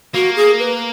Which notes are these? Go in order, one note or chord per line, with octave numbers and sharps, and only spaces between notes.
A#3 F#4
G#4
B4